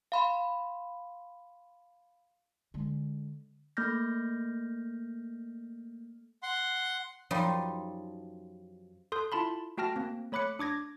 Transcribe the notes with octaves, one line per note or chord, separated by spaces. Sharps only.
F5 B5 C6
D3 G#3
A3 A#3 F6 G6 A#6
F#5 C6
F#2 F3 G3 D#4 C6
A4 C6 D#6 F#6 G6
E4 F4 A5 B5 C6
A3 F#4 G5 A5 F6 A#6
A#3 C4
A3 C#5 B5 D6 F#6 C#7
D4 D6 G#6 A#6